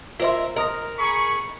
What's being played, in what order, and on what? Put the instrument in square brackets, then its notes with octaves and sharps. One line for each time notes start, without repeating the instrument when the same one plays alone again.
[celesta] F4 C5 C6 [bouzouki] A#4 D5 E5
[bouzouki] A#4 [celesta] D#5 D#6 A#6
[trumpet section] G#4 B5 C#6